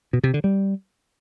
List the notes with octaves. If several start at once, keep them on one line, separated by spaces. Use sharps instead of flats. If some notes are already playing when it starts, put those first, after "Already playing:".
B2
C3
D3
G3